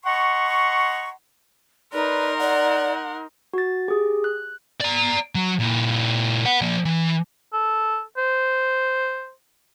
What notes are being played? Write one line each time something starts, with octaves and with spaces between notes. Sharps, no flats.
D#5 F#5 A#5 C6 C#6
D#4 A#4 B4 D5 C6
D5 F#5
F#4 A6
G4 G#4
F#6
D5 A#5
F#3
A#2 E4
B4 F#5
F3 A#3
E3
A4
C5